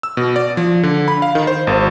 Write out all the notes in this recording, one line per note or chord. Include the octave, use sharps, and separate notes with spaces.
E6
B2
D5
F3
D3
B5
F5
D#3
C5
G#1